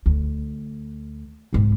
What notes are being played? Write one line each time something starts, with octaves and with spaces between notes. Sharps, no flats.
D2
C2 G#2